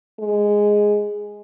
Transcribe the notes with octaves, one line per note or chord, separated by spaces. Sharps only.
G#3